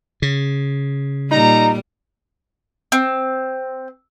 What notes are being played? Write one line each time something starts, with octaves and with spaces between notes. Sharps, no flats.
C#3
A#2 G3 D#4 A#5
C4